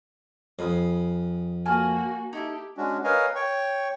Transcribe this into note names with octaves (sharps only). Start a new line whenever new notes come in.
F2 G#4 B5 D#6
A#3 F#4 G#5 A5 F6
D#4 E4 G4 A4
G#3 C#4 D4 F#4
A#4 B4 C#5 D#5 F5 G#5
C#5 G5 C#6